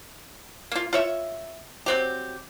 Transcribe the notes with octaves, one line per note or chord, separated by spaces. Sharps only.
A#3 F4
F4 C#5 E5
F#3 C4 G4